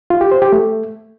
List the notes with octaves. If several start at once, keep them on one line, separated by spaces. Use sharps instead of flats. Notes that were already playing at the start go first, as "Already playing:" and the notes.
F4
G4
C5
G4
A3